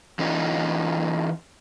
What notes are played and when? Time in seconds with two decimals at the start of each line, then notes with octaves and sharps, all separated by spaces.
0.19 E3 C#4 D#4 F4